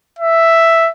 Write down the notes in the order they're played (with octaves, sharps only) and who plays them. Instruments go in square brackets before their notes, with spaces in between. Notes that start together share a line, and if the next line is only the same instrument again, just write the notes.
[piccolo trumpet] E5